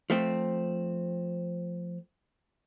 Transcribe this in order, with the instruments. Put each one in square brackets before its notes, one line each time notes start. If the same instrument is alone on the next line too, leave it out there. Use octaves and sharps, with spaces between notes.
[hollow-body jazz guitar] F3 A3 C4